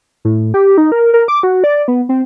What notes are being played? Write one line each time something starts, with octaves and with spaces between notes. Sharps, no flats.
A2
G4
D#4
A#4
A#4
D6
F#4
D5
B3
C4